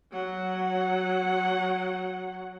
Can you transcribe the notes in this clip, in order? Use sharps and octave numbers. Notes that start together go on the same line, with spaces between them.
F#3 F#5